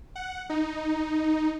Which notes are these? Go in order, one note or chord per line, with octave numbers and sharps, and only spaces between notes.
F#5
D#4